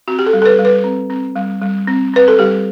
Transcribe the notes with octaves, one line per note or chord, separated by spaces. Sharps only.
C4 F#4
G4
A4
G3
A4
B4
G3
B4
C4
C4
G3
G3
C4
C4 B4
A4
G3 G4